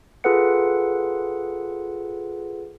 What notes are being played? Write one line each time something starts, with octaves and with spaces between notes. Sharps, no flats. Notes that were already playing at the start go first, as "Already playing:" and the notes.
F4 G#4 A4 B4 F#5 C#7